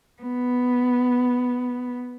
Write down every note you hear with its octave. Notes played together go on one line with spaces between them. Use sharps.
B3